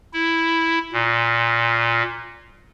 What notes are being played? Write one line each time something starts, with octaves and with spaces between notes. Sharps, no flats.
E4
A#2